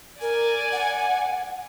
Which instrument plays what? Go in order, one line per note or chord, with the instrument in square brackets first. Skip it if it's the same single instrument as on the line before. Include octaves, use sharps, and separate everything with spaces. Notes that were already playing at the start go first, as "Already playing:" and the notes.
[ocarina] A#4 [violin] D5 G#5
[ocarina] F#5